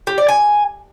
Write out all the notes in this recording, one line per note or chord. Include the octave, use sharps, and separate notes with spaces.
G4
D5
G#5